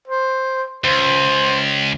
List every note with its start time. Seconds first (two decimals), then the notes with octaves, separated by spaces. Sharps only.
0.08 C5
0.84 C#2 C5